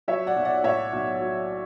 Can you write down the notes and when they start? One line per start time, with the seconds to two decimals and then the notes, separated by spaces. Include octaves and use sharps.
0.08 F#3 C#5 E5
0.27 D5 F#5
0.36 B1
0.45 D5 F#5
0.64 A2 C#5 E5
0.93 B1
1.21 F#3